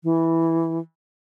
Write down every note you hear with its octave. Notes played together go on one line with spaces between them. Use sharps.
E3